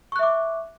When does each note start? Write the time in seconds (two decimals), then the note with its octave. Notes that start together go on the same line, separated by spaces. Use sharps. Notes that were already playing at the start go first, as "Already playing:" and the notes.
0.12 C#6
0.16 F#6
0.19 E5
0.23 D6